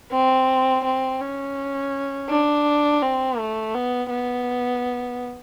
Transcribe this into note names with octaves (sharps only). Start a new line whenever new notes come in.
C4
C4
C#4
D4
C4
A3
B3
B3